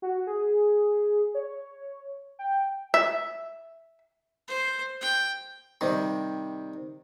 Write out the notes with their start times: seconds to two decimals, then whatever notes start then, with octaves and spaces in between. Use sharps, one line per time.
0.02 F#4
0.27 G#4
1.35 C#5
2.39 G5
2.94 E5
4.48 C5
5.01 G5
5.81 C3 D#3 G3